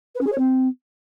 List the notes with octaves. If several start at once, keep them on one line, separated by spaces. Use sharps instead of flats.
B4
C#4
G#4
C#5
C4